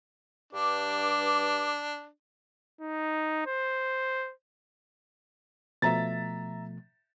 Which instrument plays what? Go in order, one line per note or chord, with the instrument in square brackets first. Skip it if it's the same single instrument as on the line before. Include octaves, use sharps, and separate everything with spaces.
[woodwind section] G2 D6 [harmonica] D4
[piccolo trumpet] D#4
C5
[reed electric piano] B2 F3 A3 [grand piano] E5 A#5 A6